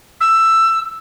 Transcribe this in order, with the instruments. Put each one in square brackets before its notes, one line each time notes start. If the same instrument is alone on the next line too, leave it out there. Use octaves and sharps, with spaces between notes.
[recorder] E6